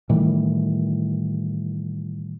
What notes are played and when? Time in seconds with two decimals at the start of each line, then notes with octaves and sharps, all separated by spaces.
0.09 A2 D#3 E3 G3